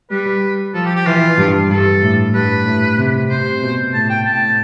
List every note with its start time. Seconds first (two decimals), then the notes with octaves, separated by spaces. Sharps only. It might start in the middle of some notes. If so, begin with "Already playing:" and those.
0.10 G3 B4
0.74 F3 A4
0.85 G4
0.95 G4
1.06 E3 F4
1.38 G2
1.70 G2 A4
2.02 A2
2.34 G2 B4
2.66 A2
2.98 C3
3.30 C3 C5
3.62 B2
3.93 A2 A5
4.10 G5
4.26 A2 A5